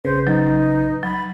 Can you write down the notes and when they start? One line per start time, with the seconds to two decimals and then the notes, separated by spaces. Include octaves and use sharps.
0.05 A#1 C#3 B4 C5
0.27 F#3 D#4
1.03 F#3 B5